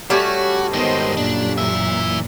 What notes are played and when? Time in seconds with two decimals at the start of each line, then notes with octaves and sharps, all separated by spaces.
0.10 G3 A3 C#4 F#4
0.74 G#2 D#3 B3 C5 D#5
1.17 F#2 A#2 D4
1.58 E3 E5